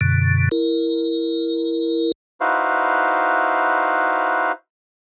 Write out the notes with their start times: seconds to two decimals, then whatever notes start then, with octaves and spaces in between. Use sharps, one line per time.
0.01 F#2 B2 D3
0.51 E4 A#4
2.41 D#4 E4 F#4 B4 C5 F5